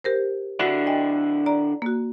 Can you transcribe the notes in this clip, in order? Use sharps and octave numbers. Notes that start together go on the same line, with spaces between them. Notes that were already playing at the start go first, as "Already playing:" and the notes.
G4 A#4 C5
D3 D4 E4 F#4 F#5
D#5 G5 G#5
D5 A#5
A#3 F#4